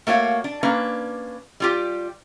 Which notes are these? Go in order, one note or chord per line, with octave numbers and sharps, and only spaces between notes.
A3 A#3 F#4 C#5 F5
D4
A#3 C#4 D4 B4
G3 F4 G4